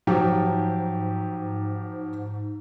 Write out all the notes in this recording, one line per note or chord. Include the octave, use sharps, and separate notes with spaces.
G#2 F3 F#3 G4